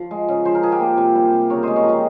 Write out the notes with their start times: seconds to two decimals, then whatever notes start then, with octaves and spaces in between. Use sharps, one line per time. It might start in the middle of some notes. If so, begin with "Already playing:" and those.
Already playing: F3
0.11 G#3
0.29 C#3
0.45 F3 C5
0.55 A#4
0.63 F3 G#4
0.72 G4 A#4
0.80 A#3
0.98 C3
1.15 G3
1.33 C3
1.50 C#3 A#4 C#5
1.63 G#3 C5 D#5
1.76 A#4 C#5
1.85 F3 C4 D#4